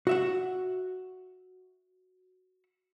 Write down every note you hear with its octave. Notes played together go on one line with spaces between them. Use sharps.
F#4 E5 F#5